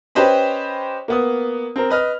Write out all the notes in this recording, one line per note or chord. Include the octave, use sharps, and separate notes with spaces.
C#4 G4 B4 C5 D#5 B5
A#3 B3 D#6
C4 A#4
B4 D#5 F6